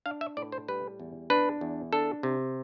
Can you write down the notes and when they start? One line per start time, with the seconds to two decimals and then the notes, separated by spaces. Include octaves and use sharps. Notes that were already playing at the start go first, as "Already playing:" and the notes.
0.06 D4 F5
0.21 E5
0.37 A2 D5
0.52 C5
0.68 G3 B4
1.00 E2
1.30 D4 B4
1.61 E2
1.93 D4 A4
2.23 C3